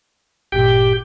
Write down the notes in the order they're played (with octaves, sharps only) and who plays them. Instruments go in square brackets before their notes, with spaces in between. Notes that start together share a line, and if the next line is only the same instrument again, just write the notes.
[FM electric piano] G#1 G2 A#2 [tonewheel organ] G4 G5